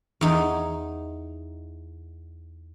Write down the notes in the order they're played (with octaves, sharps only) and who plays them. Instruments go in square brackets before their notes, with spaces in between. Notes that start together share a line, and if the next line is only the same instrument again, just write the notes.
[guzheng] E2 D#4